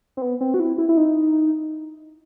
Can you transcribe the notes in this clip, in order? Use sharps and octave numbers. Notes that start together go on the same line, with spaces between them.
C4
B3
C4
F#4
E4
E4
E4
D#4